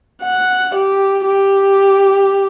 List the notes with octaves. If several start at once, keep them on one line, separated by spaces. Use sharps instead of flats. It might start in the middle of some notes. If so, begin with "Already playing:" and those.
F#5
G4
G4